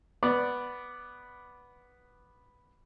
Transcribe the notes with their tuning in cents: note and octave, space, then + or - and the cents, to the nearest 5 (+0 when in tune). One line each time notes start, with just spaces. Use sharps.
B3 +0 D5 +0